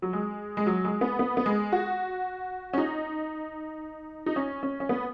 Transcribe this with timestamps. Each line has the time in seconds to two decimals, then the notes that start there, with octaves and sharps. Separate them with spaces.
0.02 F#3
0.13 G#3
0.57 G#3
0.66 F#3
0.85 G#3
1.01 B3
1.19 B3
1.37 B3
1.46 G#3
1.72 F#4
2.73 C#4
2.78 D#4
4.26 D#4
4.36 C#4
4.63 C#4
4.80 C#4
4.89 B3